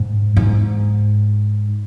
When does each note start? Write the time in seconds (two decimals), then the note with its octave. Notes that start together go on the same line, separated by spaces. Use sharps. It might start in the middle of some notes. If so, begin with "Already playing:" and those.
Already playing: G#2
0.36 G#2